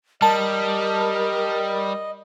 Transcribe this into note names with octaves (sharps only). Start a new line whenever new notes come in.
G3 A#4 D#5 A5